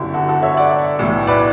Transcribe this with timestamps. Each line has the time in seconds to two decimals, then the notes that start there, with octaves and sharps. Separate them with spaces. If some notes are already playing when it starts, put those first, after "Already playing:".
Already playing: G1 F#2 D3 E4 G4
0.14 F#4 A4
0.29 F#4 A4
0.43 C#5 E5
0.57 D5 F#5
0.99 B1 A2 E3
1.27 B4 D5